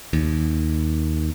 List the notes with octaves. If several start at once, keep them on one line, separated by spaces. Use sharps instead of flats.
D#2